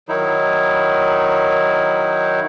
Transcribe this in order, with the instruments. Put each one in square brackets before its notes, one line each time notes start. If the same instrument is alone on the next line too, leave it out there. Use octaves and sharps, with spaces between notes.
[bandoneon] D#3 F#3 D#4 E4